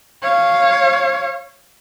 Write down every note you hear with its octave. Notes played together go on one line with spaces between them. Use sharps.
C#5 F5